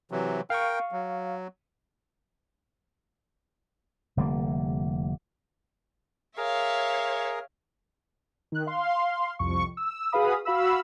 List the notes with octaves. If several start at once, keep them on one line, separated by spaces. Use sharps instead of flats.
C3 E3 F#3
A#4 F5 G5 C#6
F#3
F1 D3 G3 A#3
G#4 A#4 C#5 E5 F5
D#3 F#6
F5 C6
C2 F2 C#6
E6
F#4 G#4 B4 F5 B5 D#6
F#4 F5 B5 E6